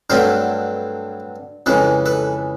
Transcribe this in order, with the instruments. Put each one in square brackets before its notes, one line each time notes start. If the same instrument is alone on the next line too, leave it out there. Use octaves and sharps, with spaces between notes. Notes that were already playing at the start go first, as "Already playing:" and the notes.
[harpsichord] G2 D3 F#3 A3 C4 A#4 C5
F2 C#3 E3 G#3 A4 B4
A4 B4